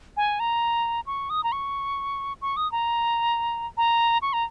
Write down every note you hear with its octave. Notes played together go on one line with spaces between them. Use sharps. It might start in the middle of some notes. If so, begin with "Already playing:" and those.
G#5
A#5
C#6
D#6
A#5
C#6
C#6
D#6
A#5
A#5
C#6
A#5